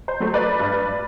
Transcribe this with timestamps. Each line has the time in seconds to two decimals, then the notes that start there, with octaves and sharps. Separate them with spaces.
0.08 C5
0.20 F#3 A3
0.34 B4 D5
0.60 G2